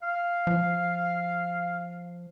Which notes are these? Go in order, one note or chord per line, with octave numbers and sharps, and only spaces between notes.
F5
F3